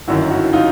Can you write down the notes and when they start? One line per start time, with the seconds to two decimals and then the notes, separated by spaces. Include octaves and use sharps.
0.08 G1 F#2 D#3 E4 F#4
0.31 E4 F#4
0.53 D#4 F4